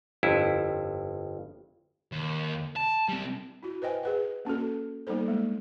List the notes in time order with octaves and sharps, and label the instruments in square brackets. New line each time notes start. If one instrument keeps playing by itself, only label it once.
[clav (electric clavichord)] G1 F2 E4
[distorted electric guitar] D#2
A5
G3 C4
[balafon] E4 F#4
B4 C5 D#5 G5 G#5
G#4 B4 F#5
A#3 C#4 F#4 A4
G3 A#3 B3 D#4 A4 C5
G#3 A#3